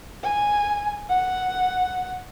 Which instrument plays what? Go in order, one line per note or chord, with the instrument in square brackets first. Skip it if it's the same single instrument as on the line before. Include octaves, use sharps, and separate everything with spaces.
[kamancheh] G#5
F#5